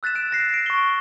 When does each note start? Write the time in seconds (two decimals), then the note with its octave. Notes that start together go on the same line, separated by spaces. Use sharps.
0.03 E6 F#6 A6 B6 E7
0.15 F#6 D7 E7
0.31 A6 A#6 C7
0.54 D7
0.66 C#6 G7